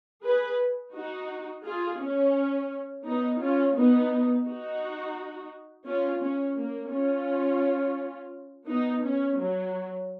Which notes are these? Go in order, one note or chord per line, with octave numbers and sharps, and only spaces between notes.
G#4 B4
D#4 F#4
F4 G#4
C#4
B3 D#4
C#4 F4
B3 D#4
D#4 F#4
C#4 F4
C#4
A#3
C#4 F4
B3 D#4
C#4
F#3